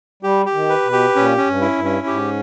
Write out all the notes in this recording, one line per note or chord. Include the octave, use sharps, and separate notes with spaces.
G3 G4
G4
D#3
B4
B2
G4
A#2 C#4
C#4
G2
E4
G2
C#4
G#2 G4